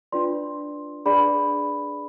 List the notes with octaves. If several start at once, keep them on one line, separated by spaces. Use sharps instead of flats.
D4 F4 B4 D5 C6
D4 G#4 B4 D5 B5